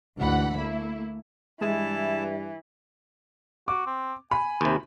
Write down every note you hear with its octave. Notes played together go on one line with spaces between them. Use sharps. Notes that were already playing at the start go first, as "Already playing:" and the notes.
D2 G#2 E3 F#5 B5
A3 A#3 E4
G2 E3 G#3 E4 A5
F#4 D6
C4
G#5 B5
D#2 C3